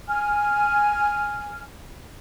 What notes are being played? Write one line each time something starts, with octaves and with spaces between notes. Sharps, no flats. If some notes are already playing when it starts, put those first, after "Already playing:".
G#5 F6